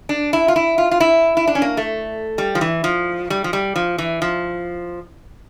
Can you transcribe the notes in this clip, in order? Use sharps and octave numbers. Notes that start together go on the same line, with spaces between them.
D4
E4
F4
E4
F4
F4
E4
E4
D4
C#4
A#3
A3
G3
F3
E3
F3
G3
F3
G3
F3
E3
F3